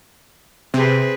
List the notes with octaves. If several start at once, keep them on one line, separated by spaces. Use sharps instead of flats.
C3 C4 G#4 B4